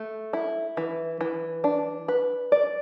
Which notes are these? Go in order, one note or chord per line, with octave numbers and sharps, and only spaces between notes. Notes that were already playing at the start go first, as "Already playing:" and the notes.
Already playing: A3
E4
E3
E3
D4
B4
D5